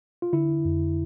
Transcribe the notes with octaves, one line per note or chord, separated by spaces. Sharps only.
F4
D3 E4
F2